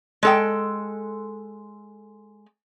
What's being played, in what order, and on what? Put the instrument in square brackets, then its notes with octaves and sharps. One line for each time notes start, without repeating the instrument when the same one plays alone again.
[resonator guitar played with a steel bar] G#3 A4 G5